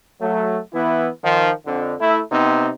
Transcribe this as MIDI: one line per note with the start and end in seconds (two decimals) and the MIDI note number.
0.21 0.58 54
0.21 0.58 57
0.73 1.08 52
0.73 1.08 59
0.73 1.08 64
1.23 1.51 51
1.23 1.51 53
1.66 1.94 41
1.66 1.94 50
2.00 2.21 57
2.00 2.21 64
2.31 2.69 48
2.31 2.69 59
2.31 2.69 60
2.31 2.69 63